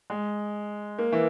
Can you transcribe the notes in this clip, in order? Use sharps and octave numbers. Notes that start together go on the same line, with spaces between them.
G#3
A#3
E3